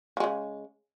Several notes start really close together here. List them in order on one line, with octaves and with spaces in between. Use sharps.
F3 G#3 C#3